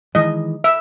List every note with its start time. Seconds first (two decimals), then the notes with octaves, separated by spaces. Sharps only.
0.15 D#3 E3 G#3 D#5
0.64 E5